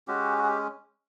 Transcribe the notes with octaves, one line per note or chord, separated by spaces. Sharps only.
G#3 C#4 F#4 G4
F#4
G#4
G4